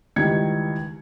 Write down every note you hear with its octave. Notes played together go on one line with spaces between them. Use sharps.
C#2 D#3 E3 G3 G#6 C#7